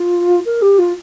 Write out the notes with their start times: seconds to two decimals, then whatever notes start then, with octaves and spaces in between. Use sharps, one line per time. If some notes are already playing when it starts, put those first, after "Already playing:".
Already playing: F4
0.45 A#4
0.62 G4
0.78 F4